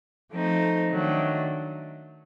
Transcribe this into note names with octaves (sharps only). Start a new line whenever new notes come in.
F3 A3 C4 D#4
D#3 F#3 A3 D4